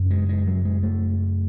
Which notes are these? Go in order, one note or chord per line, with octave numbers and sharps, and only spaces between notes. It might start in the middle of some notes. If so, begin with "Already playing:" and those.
Already playing: F#2 C#3
G#3
G#3
F#3
G#3
A3